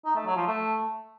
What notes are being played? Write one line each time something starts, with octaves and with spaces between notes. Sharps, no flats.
D#4
A3
F#3
F3
A3